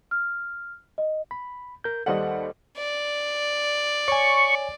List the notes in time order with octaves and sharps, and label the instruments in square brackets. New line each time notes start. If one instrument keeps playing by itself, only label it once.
[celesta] F6
D#5
[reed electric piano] B5
A#4 G6
[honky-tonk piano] D#2 G3 F#5 [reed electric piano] A4 C5 D#5
[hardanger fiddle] D5
[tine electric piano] C#5 G#5 [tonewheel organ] C#6